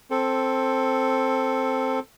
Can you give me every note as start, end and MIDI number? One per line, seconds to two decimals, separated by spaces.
0.11 1.99 60
0.11 1.99 69